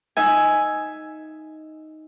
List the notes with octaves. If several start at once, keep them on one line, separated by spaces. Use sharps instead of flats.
D#4 E5 G#5